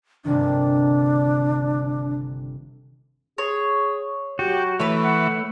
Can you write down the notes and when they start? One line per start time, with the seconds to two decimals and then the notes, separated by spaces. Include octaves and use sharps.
0.25 G1 C3 D#3 D4
3.38 G#4 C#5
4.39 F#3 F#4 G4
4.80 E3 A3 B4 C#5
5.04 F#5